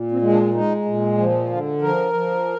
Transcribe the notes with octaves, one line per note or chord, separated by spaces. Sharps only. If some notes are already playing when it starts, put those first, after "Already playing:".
Already playing: A#2
C4
G#3
D4
G#3 D#4
A#2
F3
D3 F4
F3 A#4
F3